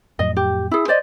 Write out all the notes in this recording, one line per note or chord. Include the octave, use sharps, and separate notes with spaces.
F2 A2 F#3 D#5
G4
E4 G#4
C5 D5 D#5